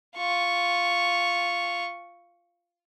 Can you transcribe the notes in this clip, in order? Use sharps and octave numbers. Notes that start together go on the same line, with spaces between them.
F4 C#6